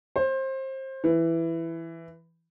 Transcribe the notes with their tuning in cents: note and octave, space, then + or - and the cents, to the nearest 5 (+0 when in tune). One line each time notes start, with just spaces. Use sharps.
C5 +25
E3 +5